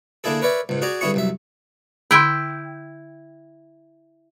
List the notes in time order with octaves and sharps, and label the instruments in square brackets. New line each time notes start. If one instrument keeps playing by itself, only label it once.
[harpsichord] D3 A#3 D4 E4 G#4 A4
A#4 B4 C#5 D5 E5
C#2 G#2
F#4 G#4 D5 A#5
G2 D3 C#4 E4 G#4 C#6
C2 F#2 E5
[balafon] D3 B5 C6 [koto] E4 G5